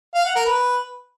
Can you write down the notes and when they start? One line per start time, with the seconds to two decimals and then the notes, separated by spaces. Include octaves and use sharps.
0.14 F5
0.25 F#5
0.35 A#4
0.46 B4